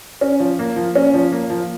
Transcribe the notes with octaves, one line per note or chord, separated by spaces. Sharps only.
C#4
F3
A#3
F3
C#4
F3
A#3
F3